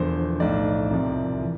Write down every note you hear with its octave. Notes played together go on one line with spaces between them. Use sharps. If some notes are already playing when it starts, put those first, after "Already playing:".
Already playing: E1 E2 D3 F3 C5
B1 A2 F3 D5
C2 C3 F3
E3